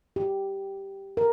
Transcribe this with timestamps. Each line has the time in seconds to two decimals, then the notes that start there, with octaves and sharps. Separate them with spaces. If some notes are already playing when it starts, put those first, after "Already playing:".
0.16 G4
1.17 A#4